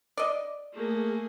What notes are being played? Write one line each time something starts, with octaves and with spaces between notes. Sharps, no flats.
D5 D#5
A3 A#3 G#4